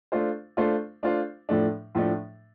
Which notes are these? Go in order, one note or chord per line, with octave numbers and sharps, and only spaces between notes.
A3 D4 F4 C5
A3 D4 F4 C5
A3 D4 F4 C5
A2 F3 A3 D4
A2 F3 A3 D4